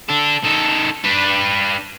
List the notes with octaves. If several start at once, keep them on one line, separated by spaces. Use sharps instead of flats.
D4 A4
D#3 A4
D4 B4